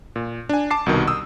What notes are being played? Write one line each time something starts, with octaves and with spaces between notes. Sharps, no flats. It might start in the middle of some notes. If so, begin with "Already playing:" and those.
A#2
D4 G#5
A5 D6 C7
C2 B2 D#3
D#6 E6